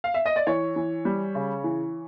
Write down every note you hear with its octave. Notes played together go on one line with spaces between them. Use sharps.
F5
E5
D#5
D5
E3 C#5
E3
G3
C#3
E3